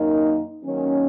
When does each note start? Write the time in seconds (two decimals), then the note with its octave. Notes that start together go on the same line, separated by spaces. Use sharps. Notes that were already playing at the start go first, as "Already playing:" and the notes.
Already playing: F#2 D#3 A#3 D#4
0.63 D#3 F#3 A#3 C#4